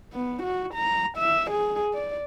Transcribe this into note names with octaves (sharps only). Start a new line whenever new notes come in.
B3
F#4
A#5
E5
G#4
D5